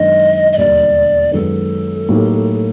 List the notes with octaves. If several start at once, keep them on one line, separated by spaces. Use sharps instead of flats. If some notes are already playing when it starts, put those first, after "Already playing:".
Already playing: F#2 D#3 G#3 B3 D4 D#5
D#5
E1 D#2 D3 G3 A#3 D5
F#2 D#3 G#3 B3 A4
A2 F#3 A#3 D#4 G4